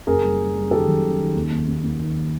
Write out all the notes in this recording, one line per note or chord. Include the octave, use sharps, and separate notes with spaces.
F#1 G#4 A#4
G3
G3
G3
D#3 G4 A4
F#2
D#3
D#3
D#2
D#2
D#2
D#2
D#3